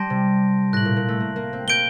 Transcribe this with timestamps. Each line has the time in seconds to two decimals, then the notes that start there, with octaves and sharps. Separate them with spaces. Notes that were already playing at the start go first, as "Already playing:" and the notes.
Already playing: G3 A5 C6 G6 A#6 D7
0.10 C3
0.73 A2 F#6 A#6 F#7
0.85 A#2
0.96 A#2
1.08 A3
1.20 A#3
1.36 A#3
1.53 C4
1.67 A#3 G6 D7 G7